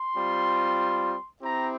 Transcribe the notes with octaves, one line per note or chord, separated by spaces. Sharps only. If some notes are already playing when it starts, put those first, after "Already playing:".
Already playing: C6
G3 C4 F4
C4 E4 G4 A#5